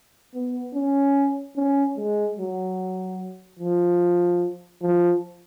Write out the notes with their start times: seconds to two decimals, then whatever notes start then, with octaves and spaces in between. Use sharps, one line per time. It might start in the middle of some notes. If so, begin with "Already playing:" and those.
0.34 B3
0.74 C#4
1.56 C#4
1.97 G#3
2.38 F#3
3.59 F3
4.82 F3